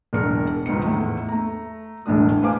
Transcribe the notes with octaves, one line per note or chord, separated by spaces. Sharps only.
E1 B1 D4 A#4 C#7
C#2 G#2 D#3 B3 D#5 C#7
E2 A2 A3
A3 A#5
E1 A1 D2 A2 D4 D#6
B4 C5 F5 G#5 D6